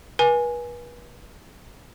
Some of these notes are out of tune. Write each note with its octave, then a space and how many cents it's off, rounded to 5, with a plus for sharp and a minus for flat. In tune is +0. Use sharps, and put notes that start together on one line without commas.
B4 -40 G#5 +0